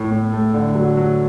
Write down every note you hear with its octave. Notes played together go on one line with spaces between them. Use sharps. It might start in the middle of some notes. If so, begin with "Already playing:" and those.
Already playing: A2 A3
A2
A3
D3
F#3
F#3